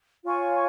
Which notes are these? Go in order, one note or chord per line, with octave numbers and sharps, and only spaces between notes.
F4 C#5 G#5 C#6